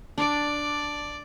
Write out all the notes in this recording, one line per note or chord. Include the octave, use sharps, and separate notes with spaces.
D4 D5 D6